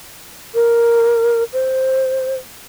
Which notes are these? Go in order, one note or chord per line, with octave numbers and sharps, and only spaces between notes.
A#4
C5